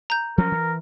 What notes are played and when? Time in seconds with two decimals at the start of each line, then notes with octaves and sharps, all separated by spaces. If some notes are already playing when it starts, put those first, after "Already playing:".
0.10 A#5 G6
0.38 F3 F#3 C#4 A#4
0.52 E3